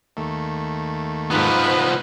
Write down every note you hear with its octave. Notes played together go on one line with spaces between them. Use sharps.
D#2 A3
G#2 F3 B3 D#4 B4